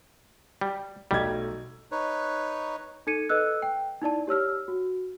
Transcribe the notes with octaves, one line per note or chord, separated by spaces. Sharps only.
G3
B1 G3 A3 G#6
D#4 B4 C#5
D#4 A4 G#6 C#7 D#7
A4 B4 D#5 E6 F#6
G5
D#4 E4 D5 A5
G4 C#5 E6 F6
F#4